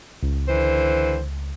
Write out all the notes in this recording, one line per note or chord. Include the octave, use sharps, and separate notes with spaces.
C#2
D3 E3 C5